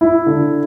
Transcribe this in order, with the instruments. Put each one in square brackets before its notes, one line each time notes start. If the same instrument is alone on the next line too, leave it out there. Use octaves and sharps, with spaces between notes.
[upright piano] E4
D3